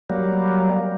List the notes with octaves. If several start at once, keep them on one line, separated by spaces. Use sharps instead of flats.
F#3 G3 A#3